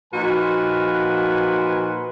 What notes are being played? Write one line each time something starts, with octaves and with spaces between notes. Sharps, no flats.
A#2 F3 D#4 F#4 B4 G#5